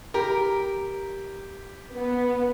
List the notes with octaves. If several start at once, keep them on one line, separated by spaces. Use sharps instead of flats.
G4 A#4
B3